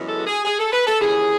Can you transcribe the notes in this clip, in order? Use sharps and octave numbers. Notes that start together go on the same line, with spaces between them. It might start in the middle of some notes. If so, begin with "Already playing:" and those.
Already playing: F#2 C#3 E3 G#3 B3
A4
F#4
G#4
G#4
A4
B4
A4
D#2 C#3 E3 G#4